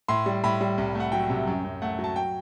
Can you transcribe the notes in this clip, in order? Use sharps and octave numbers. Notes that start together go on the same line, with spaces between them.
A2 C6
G3
A2 B5
G3
C2
A3
F#5
F#3 G5
C3
F#2
F#2
A3 F#5
F#3
A5
G5